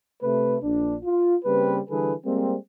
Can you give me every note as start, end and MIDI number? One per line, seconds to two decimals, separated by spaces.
0.22 0.57 48
0.22 0.57 57
0.22 0.57 71
0.63 0.96 34
0.63 0.96 62
1.03 1.35 65
1.45 1.79 49
1.45 1.79 55
1.45 1.79 58
1.45 1.79 60
1.45 1.79 71
1.89 2.14 50
1.89 2.14 52
1.89 2.14 55
1.89 2.14 68
1.89 2.14 69
1.89 2.14 71
2.25 2.55 55
2.25 2.55 56
2.25 2.55 58
2.25 2.55 60